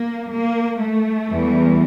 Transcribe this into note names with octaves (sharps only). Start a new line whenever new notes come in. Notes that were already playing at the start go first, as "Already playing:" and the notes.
Already playing: A#3
A#3
A3
E2 E3 G3